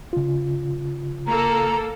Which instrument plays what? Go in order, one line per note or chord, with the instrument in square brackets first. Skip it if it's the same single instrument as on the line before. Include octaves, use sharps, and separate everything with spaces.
[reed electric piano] C#3 F4
[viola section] A#3 A4 [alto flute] A#5